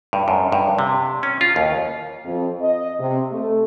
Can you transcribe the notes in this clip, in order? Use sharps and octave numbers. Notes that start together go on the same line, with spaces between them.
G2
F#2
G2
C3
C#4
F4
D#2
F2
D#5
C3
A3